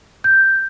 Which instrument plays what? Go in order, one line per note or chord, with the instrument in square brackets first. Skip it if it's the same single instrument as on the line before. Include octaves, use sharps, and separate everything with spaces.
[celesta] G6